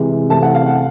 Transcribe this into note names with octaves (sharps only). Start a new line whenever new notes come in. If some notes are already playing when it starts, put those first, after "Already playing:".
Already playing: C3 E3 G#3
C3 E3 A3 C4 A5
F#5
F5
F#5